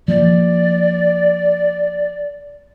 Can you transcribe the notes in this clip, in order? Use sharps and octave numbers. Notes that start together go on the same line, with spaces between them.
F3 A#3 D5